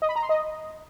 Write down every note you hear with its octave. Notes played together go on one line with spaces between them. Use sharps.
D#5
B5
A#5
C6
D#5